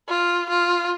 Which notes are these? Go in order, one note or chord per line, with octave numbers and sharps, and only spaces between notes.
F4
F4